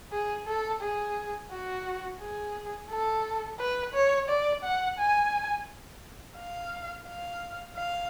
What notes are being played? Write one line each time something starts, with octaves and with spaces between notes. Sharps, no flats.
G#4
A4
G#4
F#4
G#4
A4
B4
C#5
D5
F#5
G#5
F5
F5
F5